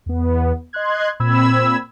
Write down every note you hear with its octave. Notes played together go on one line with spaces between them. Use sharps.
E2 B3
D#5 C6 F#6 G#6
A#2 C4 B5 E6 G#6